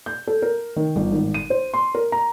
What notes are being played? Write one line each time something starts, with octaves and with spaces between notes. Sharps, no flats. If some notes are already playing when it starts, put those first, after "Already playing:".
G6
A4
A#4
D#3
G1
G#1
D#7
C5
C6
A#4
A#5